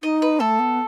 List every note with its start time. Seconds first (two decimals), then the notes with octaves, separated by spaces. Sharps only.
0.03 D#4 D#5
0.22 B4
0.40 A3 A4
0.59 B3